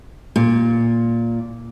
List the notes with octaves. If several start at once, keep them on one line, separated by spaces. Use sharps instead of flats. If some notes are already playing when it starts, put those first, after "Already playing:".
A#2